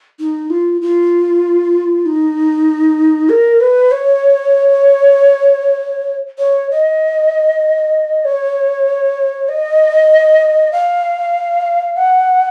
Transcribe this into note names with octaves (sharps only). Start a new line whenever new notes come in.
D#4
F4
F4
D#4
A#4
B4
C#5
C#5
D#5
C#5
D#5
F5
F#5